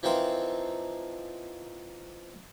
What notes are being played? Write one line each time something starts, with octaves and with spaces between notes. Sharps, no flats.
E3 F3 C4 D#4 A#4 C5